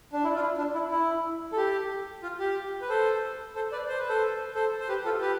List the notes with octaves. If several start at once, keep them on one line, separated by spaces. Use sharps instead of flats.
D4
E4
F4
E4
D4
E4
E4
A4
G4
F4
G4
B4
A4 C5
A4 C5
B4 D5
C5
B4
A4 C5
A4 C5
C5
G4 B4
F4 A4
G4 B4